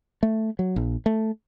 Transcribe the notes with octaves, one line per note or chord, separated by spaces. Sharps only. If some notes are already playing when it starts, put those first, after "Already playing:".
A3
F#3
A#1
A3